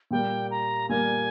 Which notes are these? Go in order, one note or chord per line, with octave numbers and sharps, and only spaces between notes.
A#2 G3 A#3 G5
A#5
A#2 G3 A#3 G#5